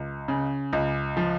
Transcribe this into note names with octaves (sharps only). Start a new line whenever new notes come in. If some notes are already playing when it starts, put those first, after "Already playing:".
Already playing: C#2
C#3
C#2
F3